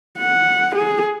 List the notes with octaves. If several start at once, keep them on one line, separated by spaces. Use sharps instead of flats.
F#5
G#4